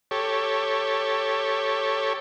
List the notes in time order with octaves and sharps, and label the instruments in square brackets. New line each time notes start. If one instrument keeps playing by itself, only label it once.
[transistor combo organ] G4 A4 C#5